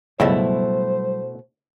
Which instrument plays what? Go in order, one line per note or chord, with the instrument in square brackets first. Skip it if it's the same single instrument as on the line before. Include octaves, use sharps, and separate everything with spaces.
[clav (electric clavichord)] C#2 G2 [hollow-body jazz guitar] B2 A3 E4 [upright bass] F#3 G3 [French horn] C5